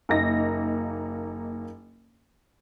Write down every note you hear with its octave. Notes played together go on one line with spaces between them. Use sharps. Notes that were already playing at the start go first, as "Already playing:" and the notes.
F#1 A#3 D#4 A#6